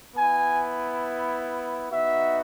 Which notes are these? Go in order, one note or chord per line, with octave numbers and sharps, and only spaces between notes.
B3 E4 G#5
B3 D#4 F#4 E5